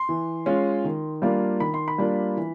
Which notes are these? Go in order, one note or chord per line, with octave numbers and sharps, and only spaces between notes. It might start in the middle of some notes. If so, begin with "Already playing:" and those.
Already playing: C6
E3
G#3 C#4 F4
D#3
G3 A#3 D4 F4
D#3 B5
C6
B5
G3 A#3 D4 F4
E3